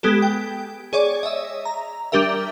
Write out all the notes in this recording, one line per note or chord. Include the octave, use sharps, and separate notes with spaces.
G#3 B3 G4 A4
G5
G#4 C#5 D5
D#5 E5
A#5
G3 D4 G4 A#4 E5